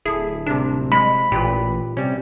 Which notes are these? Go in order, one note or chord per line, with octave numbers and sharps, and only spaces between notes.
D1 E4 G#4 A4
C2 C3 D4
G#3 B5
A1 A#2 G4 B4
C3 G3 C#4